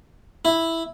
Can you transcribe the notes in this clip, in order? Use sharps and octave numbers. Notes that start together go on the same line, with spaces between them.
E4